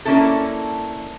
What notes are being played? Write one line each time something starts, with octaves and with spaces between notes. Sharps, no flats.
A#3 C#4 D4 E4 A4